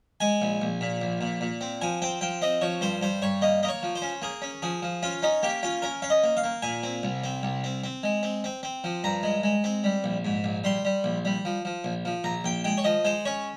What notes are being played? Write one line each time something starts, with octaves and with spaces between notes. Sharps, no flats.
G#3 G#5
A#1
A#1
A#2
A#1
A#2
A#2
C4
F3 G#5
C4 G5
F3 G5
C4 D#5
F3 C#5
G2 C5
G2 C5
G2 C#5
A#3 D#5
A#3 D#5
C#5
F3
C5
C#4
A#3 G#4
C#4
F3 G#4
F3
C#4 F4
C#4 D#4
A#3 G4
C#4 F4
C#4 A#4
C#4 F5
D#5
A#3
F5
A#3
A#2 G#5
C4
C2
C4
C2
C4
C4
G#3
C4
C4
C4
F3
G2 A#5
G#3
G#3
C4
G3
A#1
G#2
A#1
G3 C6
G3
A#1
G3
F3
F3
A#1
F3
A#1 A#5
A#1 G5
G#3 G5
C#5
F3 D#5
G#3 C5
C#4 C#5